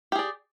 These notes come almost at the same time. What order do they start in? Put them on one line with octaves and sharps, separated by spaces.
G4 G#4 D5